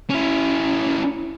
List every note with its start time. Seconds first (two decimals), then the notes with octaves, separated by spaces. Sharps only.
0.10 C#4 E4